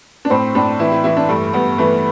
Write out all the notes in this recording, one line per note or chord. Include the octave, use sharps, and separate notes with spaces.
D4
A2 C4
A2 D4
E3 E4
E4
E3 E4
D4
G2 A3
G2 B3
E3 A3